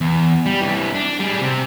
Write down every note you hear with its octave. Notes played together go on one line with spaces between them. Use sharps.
E2
G3
C2 E3
D4
G3 G#4
C3